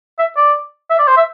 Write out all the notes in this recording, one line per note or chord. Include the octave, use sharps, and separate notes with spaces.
E5
D5
E5
D5
C5
E5